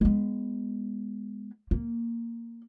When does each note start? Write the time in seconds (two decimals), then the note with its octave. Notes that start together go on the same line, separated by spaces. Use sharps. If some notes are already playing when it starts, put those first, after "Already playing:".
0.01 G#3 B3
1.71 A#3